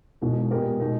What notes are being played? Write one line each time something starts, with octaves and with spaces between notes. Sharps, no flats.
E1 E2 B2 G#3 D#4
A#2 G#3 B3 G4 A#4
B2 G#3 D#4